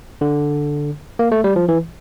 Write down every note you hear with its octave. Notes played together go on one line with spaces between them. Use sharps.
D3
A#3
A3
G3
F3
E3